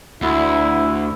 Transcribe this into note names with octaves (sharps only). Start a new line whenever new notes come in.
D2 E4